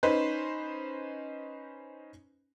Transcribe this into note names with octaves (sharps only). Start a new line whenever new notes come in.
C#4 D#4 B4 C5